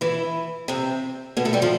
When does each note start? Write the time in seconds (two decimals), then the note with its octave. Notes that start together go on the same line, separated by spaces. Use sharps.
0.01 E3 E4
0.68 C3 C4
1.37 B2 B3
1.45 A3 A4
1.53 G3 G4
1.62 F3 F4